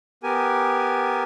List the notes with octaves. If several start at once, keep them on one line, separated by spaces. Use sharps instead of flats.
B3 G4 A#4 G#5